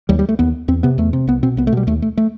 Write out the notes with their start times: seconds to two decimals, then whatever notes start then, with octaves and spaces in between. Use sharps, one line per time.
0.09 D#2 G3
0.19 G3
0.29 A3
0.39 D#2 B3
0.68 E2 C4
0.83 C3 B3
0.98 E2 A3
1.13 C3
1.27 C2 B3
1.43 B2 C4
1.57 C2 B3
1.67 A3
1.72 B2 G3
1.87 D#2 A3
2.02 A3
2.17 A3